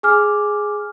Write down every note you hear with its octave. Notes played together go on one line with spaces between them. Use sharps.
G#4 G#5 D6 F6